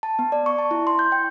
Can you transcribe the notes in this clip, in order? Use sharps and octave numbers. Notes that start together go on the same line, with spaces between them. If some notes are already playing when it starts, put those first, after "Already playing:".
A5
B3
D5
C#6
A5
E4
C6
G6
G5